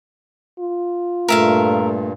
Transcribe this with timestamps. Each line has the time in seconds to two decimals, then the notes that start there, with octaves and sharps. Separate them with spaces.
0.60 F4
1.28 G2 A#2 A3 A#4 E5 F5